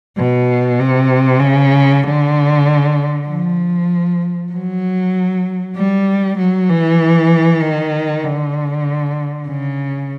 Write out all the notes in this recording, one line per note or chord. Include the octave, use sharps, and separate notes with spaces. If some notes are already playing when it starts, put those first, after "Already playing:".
B2
C3
C#3
D3
F3
F#3
G3
F#3
E3
D#3
D3
C#3